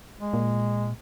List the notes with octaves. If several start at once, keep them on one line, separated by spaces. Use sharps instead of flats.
G#3
A#2